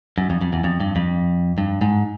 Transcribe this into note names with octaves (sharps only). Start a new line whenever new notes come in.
F#2
F2
F2
E2
F2
G2
F2
G2
G#2